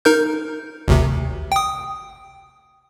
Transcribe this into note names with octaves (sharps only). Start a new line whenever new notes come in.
D#4 A#4 G6
G#1 D2 C3
G5 D#6